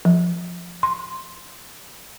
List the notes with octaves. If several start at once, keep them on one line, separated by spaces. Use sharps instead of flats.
F3
C6